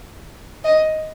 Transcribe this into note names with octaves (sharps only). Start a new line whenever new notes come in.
D#5